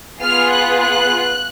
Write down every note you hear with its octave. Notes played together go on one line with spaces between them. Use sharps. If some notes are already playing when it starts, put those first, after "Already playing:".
B3 F4 G#4 F6
F#6
F#6